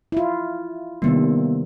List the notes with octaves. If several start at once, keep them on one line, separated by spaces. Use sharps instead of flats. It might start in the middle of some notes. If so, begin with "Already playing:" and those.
E4 F4
C3 D#3 G3 A#3 B3